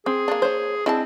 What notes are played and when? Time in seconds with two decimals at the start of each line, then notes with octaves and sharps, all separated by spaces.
0.06 C4 G#4
0.28 A#3 D4
0.42 C5 C#5
0.86 G#3 C4 D4 E4 A5